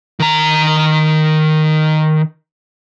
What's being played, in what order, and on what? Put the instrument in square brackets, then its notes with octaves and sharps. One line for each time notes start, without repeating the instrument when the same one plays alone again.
[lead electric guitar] D#3 A#5